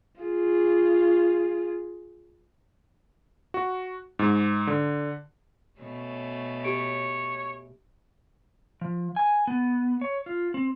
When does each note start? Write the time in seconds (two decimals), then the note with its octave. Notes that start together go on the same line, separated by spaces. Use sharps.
0.21 F4 G#4
3.54 F#4
4.19 G#2
4.67 D3
5.81 B2 A3 C#4
6.64 G4 C#5 D7
8.81 F3
9.16 G#5
9.47 B3
10.01 C#5
10.26 F4
10.54 C4